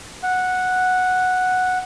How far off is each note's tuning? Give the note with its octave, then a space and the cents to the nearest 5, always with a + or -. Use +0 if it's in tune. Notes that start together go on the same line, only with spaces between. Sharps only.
F#5 -5